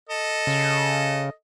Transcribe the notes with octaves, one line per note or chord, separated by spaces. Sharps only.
A4 D#5
C#3